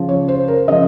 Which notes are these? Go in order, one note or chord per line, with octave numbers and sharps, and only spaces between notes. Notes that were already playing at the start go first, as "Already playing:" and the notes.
Already playing: C#3 F3
C#5
C5
A#4
C#3 F3 D#5